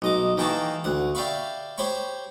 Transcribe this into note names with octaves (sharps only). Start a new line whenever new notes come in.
B1 D#5 D6
D#3 E3 A#3 G4 A5 C#6
D2 F#5
G4 D5 E5 F5 B5 C#6
G4 C5 C#5 B5 C#6